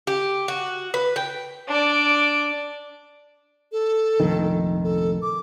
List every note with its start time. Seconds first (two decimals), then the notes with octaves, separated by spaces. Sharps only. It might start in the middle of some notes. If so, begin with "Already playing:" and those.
0.07 G4
0.48 F#4
0.94 B4
1.16 G5
1.68 D4 D5
3.72 A4
4.20 F1 A#1 D#3
4.84 A4
5.22 D6